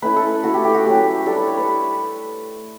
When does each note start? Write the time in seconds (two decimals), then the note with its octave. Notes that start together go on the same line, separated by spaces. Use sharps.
0.02 A3 C#4 E4 B4
0.16 A4
0.44 A3 E4 F#4
0.54 G4
0.64 G4
0.74 F#4
0.85 F#3 A3 C#4 G4
1.26 G3 D4 A4
1.37 B4
1.47 C#5
1.57 B4